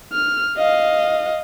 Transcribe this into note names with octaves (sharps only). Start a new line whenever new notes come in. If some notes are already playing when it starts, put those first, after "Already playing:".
F6
D#5 F5